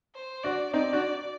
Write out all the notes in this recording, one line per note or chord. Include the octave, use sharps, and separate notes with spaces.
C5
D4 F#4 D5
C4 D#4 D5
D4 F#4